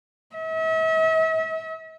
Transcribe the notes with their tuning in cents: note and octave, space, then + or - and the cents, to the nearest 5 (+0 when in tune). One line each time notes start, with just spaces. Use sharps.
E5 -40